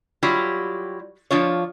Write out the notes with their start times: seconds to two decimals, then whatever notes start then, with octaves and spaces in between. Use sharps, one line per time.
0.23 F#3 G3 E4 F4 G4
1.31 F3 D4 F4 C#5